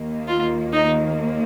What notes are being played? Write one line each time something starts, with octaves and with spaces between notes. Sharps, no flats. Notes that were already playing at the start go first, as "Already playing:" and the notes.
Already playing: D#2 D#3 A#3
F4
D#4